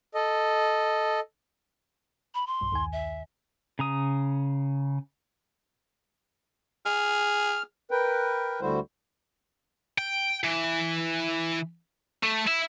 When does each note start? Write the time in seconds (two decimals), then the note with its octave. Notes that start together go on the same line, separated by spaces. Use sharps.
0.14 A4 D#5
2.35 B5
2.47 C6
2.61 B1 G2
2.72 D#2 D#3 G#5
2.93 E5
3.79 C#3 A#5 D#6
6.86 G#4 F6
7.91 A#4 B4 G5
8.61 D2 D3 G3 E4 F#4 C5
9.98 G5
10.44 E3
12.23 A3
12.47 E4